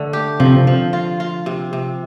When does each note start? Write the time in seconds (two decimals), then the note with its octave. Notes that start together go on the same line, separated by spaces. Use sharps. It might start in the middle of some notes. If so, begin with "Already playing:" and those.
Already playing: D3 A3
0.13 G4
0.40 C3 F3
0.67 F3
0.93 F4
1.20 F4
1.46 C3
1.73 C3